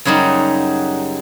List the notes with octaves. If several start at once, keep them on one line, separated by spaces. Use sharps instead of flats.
F#2 C#3 F#3 G3 D#4